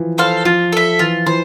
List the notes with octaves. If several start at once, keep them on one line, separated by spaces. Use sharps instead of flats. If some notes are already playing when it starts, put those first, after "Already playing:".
Already playing: E3 F3
A4 C5 F5
F3 F4
A4 E5
E3 F4
E3 C5